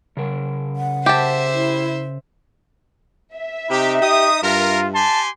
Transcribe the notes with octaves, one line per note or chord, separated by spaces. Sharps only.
C#3 A#4
F#5
G4 C5 E5 A5
E4
E5
C3 D#4 G4
G4 D#6
G2 F4 A#4
G4 G#5 A5 C6